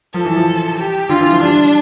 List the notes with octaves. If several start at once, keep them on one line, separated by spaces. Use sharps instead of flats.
F3 A4
E3
F3
G4
D3 F4
E3
F3
G3 D4